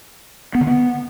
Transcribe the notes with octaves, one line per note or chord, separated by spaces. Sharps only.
B3
D3
B3